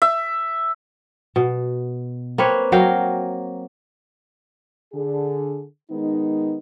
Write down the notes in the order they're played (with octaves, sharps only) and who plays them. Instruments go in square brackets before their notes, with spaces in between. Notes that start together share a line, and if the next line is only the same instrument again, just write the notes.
[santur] E5
[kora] B2
A#3 C4 B4 C#5
F#3 A#4 F5 G5
[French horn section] D3 G#4
D#3 G#3 B3 D#4